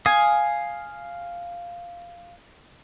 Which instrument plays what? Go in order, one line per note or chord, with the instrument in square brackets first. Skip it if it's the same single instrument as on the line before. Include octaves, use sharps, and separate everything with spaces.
[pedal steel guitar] F5 D#6 [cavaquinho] G#5